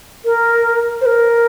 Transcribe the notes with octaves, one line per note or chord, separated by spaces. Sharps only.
A#4
C5
A#4